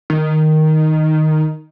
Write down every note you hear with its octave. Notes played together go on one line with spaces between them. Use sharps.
D#3